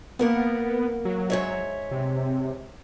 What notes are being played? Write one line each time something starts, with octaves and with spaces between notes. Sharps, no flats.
A#3 B3 A#4 F#5
F#3
G#2 C#5 E5
C3